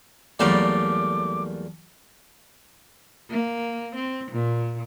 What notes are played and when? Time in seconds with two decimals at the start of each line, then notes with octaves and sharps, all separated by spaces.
0.39 E2 F#3 G3 A3 A#3 G#5 D6
3.30 A#3
3.95 C4
4.31 A#2